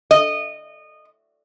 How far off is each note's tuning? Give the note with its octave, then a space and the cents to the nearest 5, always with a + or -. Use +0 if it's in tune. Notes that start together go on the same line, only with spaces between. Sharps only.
D#5 -20